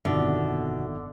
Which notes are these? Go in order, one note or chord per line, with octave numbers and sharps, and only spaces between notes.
G1 F2 B2 D3 D#3 E5